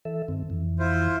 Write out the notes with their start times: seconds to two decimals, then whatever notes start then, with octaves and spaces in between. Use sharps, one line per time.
0.05 E3 A4 E5
0.28 G2 D#3 C4
0.50 F2 E3
0.79 E4 F4 C5